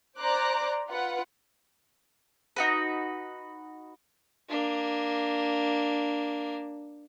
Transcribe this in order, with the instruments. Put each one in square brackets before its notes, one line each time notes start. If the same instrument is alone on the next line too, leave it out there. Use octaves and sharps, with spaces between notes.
[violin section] C5 D5 A#5 D6 F#6
F4 B4 F#5
[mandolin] D#4 F#4 B4
[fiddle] A#3 D4